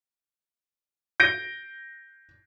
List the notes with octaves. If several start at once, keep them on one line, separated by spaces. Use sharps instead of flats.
G6 A#6 D7